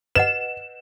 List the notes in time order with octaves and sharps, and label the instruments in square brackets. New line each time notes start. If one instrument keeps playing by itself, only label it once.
[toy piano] B4 D#5 F#5 [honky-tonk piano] E7